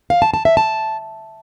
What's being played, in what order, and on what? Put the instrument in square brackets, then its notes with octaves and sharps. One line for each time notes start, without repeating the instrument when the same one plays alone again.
[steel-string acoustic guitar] F5
A5
A5
E5
A5